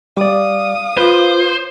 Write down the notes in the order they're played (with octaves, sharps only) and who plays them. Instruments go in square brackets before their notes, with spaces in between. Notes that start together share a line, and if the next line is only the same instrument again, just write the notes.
[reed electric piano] G3 D5 [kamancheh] F5 D#6
[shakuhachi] F4 [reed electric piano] B4 [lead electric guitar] C5